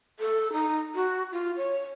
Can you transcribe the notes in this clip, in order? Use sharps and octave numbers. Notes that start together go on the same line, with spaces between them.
A4
D#4
F#4
F4
C#5